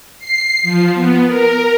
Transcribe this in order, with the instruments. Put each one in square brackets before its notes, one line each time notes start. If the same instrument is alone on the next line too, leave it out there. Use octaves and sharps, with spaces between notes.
[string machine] C7
F3
B3
A#4